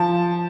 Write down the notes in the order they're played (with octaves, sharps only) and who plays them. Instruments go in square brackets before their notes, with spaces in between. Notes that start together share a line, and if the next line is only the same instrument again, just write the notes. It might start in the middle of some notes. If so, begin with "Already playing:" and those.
Already playing: [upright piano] F3 A5